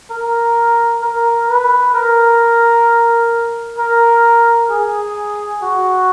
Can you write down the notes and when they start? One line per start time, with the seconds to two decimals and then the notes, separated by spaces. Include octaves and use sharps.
0.10 A#4
1.02 A#4
1.48 B4
1.94 A#4
3.78 A#4
4.70 G#4
5.63 F#4